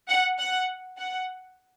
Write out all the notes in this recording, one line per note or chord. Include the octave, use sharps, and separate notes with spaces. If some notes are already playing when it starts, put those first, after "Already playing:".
F#5
F#5
F#5